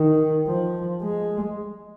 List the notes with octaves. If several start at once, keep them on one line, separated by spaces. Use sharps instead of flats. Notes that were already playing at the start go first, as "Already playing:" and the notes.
Already playing: D#3
F3
G#3